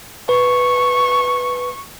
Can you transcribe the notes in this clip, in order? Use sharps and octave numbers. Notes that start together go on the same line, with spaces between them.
B4 C#6